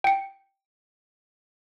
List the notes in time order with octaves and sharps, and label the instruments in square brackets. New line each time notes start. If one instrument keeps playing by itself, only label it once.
[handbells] G5 C#7